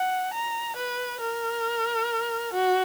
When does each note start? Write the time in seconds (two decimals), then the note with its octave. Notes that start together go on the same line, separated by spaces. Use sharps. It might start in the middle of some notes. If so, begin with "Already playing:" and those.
Already playing: F#5
0.34 A#5
0.77 B4
1.21 A#4
2.54 F#4